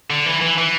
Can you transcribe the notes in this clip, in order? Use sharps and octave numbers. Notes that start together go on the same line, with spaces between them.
D3
E3
E3
E3